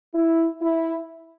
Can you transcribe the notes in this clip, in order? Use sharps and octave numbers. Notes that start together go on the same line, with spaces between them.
E4
E4